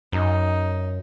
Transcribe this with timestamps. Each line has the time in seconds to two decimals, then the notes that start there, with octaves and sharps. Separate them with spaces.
0.13 F#2 D#4